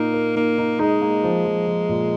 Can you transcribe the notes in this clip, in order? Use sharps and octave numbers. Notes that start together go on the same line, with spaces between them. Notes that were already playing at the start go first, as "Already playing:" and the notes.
Already playing: A#2 A#3 D#4 A#4
A#4
A#3 D#4
D#4
G#3 D#4
A#3
F3
F3
F3
A#2